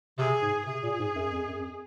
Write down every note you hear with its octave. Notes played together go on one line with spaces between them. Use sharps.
C3 G#4
G#2
C3 G#4
A#2
G#2
F#2
F2
F#2
F2